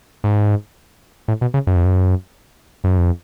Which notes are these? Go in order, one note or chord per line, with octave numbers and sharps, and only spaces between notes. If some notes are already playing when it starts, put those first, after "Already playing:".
G#2
A2
B2
C#3
F#2
F2
F#2
F#2
F2